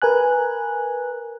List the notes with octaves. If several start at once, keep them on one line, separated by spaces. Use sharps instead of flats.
A#4 B4 G#5 F#6